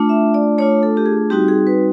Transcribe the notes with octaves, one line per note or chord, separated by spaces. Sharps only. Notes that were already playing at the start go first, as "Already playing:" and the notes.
Already playing: A3 D4 F4
E5
D5
A3 D4 F4 C#5
A4
G4
G#4
G3 C4 D#4 F#4 G4
G#4
B4